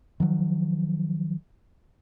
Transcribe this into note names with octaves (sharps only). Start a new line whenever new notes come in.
D#3 F3 F#3